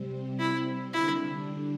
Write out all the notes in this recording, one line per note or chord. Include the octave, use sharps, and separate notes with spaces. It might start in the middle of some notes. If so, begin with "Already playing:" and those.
Already playing: C3 G3 C4
E4
D3 G3 D4 E4